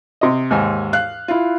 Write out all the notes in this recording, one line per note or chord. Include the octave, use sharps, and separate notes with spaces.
C3 D#5
D#2 G#2 G#5
F5 F#6
E4 F4